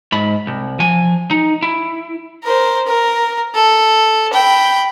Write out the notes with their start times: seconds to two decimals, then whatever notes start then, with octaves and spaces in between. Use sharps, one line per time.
0.12 G#2 B5
0.47 C2
0.80 F3 G#5
1.31 D#4
1.62 E4
2.43 A#4 C5
2.87 A#4
3.55 A4
4.33 G5 B5